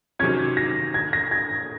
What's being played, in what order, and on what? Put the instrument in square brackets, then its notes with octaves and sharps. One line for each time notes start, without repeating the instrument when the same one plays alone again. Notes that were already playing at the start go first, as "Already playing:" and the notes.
[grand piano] C3 D#3 F#3 C#4 [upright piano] G#6
[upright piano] A#6
G#6
A#6
G#6